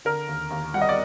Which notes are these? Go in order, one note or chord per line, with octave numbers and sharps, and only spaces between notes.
D3 A#4
D#2
D#2
G3 F#5
D#5
D5